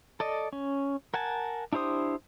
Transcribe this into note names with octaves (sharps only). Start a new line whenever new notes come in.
A4 D5 D#5
C#4
A#4 F#5 G#5 A5
D4 E4 G4 C5 D#6